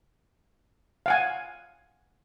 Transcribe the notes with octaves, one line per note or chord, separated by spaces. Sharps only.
F5 F#5 G#5